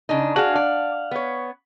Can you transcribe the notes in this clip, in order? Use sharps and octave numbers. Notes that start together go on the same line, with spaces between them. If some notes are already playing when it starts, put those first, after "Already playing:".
C#3 D4 D#4
D4 F#4 G#4 F5 F#5
D5
B3 C#5